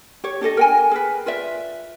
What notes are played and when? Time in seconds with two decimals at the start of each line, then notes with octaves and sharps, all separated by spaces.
0.24 G4 C#5
0.41 D4 G4 A4 D#5
0.57 A#4 G5 G#5
0.91 G#4 A#4 B4
1.26 F4 B4 D5 E5